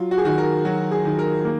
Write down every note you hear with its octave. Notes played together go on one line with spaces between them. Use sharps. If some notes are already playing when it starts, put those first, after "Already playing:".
Already playing: F#3 F4
F#4
G#4
D#3 F#4
A#4
F#3 F#4
G#4
D#3
A#4
A#3